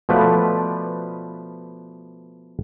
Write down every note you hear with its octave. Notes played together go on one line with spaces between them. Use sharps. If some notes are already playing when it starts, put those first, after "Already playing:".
B2 F3 A3 B4 D5